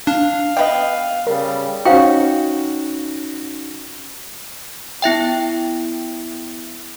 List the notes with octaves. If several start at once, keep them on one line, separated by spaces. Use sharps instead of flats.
D4 F5
B3 D5 D#5 G5
C#3 G3 A#4
C#4 D#4 F#4 C5 F5 G5
B3 E4 E5 G5